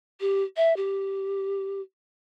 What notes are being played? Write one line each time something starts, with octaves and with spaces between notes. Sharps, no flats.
G4
E5
G4